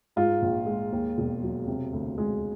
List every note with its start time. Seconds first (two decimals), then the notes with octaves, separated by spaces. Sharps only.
0.16 G#2 F4
0.42 A#1
0.66 G#3
0.92 D#2
1.18 E1
1.42 F#3
1.67 C3
1.93 D2
2.18 G#3